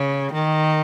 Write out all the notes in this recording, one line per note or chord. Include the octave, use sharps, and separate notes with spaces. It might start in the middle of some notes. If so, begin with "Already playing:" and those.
Already playing: C#3
D#3